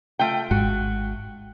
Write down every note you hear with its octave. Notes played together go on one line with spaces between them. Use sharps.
A3 F4 G5
G#1 G#2 F#4